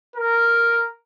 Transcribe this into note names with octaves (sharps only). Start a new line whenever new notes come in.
A#4